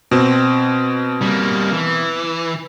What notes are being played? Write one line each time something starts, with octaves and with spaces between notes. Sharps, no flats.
B2 C4
G3 A#3
E3